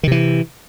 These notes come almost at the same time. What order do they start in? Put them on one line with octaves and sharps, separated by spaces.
D#3 C3 E3